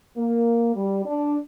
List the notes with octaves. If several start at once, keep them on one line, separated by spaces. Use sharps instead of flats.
A#3
G3
D4